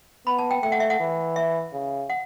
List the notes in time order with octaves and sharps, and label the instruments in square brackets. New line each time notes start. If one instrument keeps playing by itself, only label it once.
[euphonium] B3 [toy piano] B5
[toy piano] A5
G5
[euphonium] A3 [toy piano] G5
[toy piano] F#5
E5
F#5
[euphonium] E3
[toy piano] E5
[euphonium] C#3
[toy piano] F#5